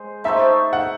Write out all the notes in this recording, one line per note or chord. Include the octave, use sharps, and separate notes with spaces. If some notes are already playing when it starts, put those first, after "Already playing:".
Already playing: G#3 C5
A3 D#4 A4 C5 E5
F#5